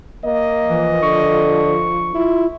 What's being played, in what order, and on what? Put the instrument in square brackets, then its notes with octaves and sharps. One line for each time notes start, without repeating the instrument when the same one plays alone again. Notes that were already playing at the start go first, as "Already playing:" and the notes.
[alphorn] A#3 [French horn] D#5
[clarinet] E3 [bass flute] F3
[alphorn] D3 [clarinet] C#6
[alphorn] E4 [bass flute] F4